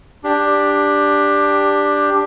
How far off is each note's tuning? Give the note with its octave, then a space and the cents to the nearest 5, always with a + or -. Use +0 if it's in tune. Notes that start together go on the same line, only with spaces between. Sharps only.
D4 +0 G4 +10